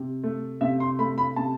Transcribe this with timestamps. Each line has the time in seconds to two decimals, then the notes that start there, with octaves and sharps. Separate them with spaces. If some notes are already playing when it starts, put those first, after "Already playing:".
Already playing: C3
0.23 A3
0.61 C3 E5
0.80 C6
0.99 A3 B5
1.18 B5
1.36 C3 A5